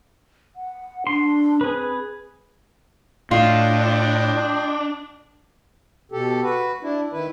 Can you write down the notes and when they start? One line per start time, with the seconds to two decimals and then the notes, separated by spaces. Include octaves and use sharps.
0.56 F#5
1.07 D4 C6
1.61 C4 G#4 B4
3.31 A2 D4 F4 D#5 G5 C6
6.12 B2 G4 A4
6.43 F#4 B4
6.83 D4 E4
7.12 D#3 E4 B4